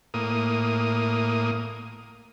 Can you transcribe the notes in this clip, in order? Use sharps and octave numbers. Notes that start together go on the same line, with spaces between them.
A2 A#3 D#6